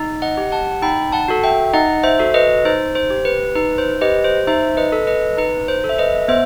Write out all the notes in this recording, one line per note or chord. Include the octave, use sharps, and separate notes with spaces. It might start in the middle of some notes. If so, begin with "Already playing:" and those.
Already playing: D#4
D#5 F#5
G4
F#5 A5
D#4 G5 B5
F#5 A5
F#4 A4
E5 G5
D#4 D#5 F#5
C5 E5
F#4 A4
B4 D#5
D#4 C5
C5
G4
B4
D#4 B4
C5
G4 B4 D#5
C5
D#4 C5 E5
B4 D#5
A4
B4 D#5
D#4 B4
C5
A4
E5
B4 D#5
B3 C5 E5